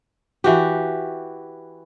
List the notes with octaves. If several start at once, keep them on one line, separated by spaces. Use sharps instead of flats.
E3 F#4 G4